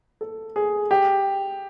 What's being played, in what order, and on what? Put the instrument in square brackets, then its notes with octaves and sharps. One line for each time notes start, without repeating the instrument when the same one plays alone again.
[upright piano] A4
G#4
G4